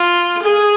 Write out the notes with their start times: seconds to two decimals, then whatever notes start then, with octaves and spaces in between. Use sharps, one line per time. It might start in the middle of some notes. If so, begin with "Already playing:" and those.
Already playing: F4
0.43 G#4